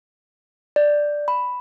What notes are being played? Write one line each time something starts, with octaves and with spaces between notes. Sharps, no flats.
D5
B5